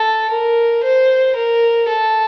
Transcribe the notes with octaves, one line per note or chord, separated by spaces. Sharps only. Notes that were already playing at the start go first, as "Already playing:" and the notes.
Already playing: A4
A#4
C5
A#4
A4